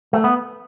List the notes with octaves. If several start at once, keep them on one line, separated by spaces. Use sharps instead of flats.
A3
B3